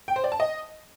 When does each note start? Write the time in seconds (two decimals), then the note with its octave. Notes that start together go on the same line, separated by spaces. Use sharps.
0.08 G5
0.16 C5
0.24 D5
0.32 A5
0.40 D#5